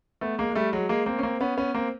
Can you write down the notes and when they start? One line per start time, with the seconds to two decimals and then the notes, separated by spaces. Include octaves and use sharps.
0.21 A3 B3
0.38 G#3 A#3
0.50 G#3
0.55 G3 A3
0.73 F#3 G#3
0.89 G#3 A#3
1.06 A#3 C4
1.18 C#4
1.23 A#3 C4
1.41 B3 C#4
1.57 B3 C#4
1.74 A#3 C4